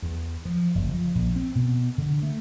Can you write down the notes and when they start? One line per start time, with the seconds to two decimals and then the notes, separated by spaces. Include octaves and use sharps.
0.02 E2
0.45 F3
0.75 F#1
0.89 F3
1.15 A#1
1.36 C4
1.55 B2
1.98 D3
2.22 A3